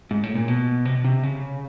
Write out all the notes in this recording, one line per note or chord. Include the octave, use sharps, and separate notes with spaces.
G#2
A2
A#2
B2
C3
B2
C3
C#3